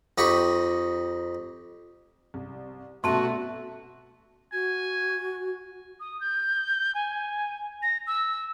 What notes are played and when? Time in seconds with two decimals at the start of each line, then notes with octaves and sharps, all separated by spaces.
0.18 F2 D#4 G4 B5 C#6
2.34 C2
3.04 C2 F#2 B2 A3 F#4 A5 C6
4.53 F#4 G#5
6.00 D#6
6.21 G6
6.95 G#5
7.83 A#6
8.07 E6